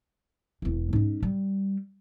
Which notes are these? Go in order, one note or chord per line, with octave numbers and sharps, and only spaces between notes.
E1 E2
G#2 C#4
G3